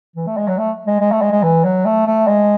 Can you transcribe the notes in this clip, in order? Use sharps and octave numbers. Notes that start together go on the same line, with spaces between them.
E3
A3
G#3
F#3
A3
G#3
G#3
A3
G#3
G#3
E3
F#3
A3
A3
G#3